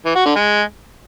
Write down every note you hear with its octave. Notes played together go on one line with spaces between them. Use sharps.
E3
F#4
D3
G#3